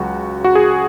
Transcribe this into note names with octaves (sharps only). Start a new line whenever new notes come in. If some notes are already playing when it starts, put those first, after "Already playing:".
Already playing: C#2 C#3 F#3 F#4
F#4
G#4